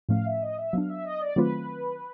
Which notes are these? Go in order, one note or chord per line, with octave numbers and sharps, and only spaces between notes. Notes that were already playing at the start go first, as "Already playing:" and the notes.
A2 F3 A3 C#4 F5
E5
D#5
E5
F#3 B3 D4 F5
E5
D#5
D5
D#3 F#3 A3 C4 F4 B4